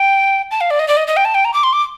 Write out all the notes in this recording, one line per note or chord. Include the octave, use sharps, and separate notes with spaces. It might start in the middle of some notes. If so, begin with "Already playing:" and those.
Already playing: G5
A5
F5
D5
D#5
D5
D#5
D#5
G5
A5
G5
A#5
D6
C6
D6